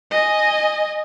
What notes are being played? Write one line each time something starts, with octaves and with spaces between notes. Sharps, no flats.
D#5 G#5